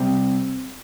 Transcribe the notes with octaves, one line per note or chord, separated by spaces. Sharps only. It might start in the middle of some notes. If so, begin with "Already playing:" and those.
Already playing: C3 G3 C4